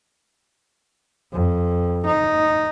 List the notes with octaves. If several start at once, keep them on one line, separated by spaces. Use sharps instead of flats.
F2
D#4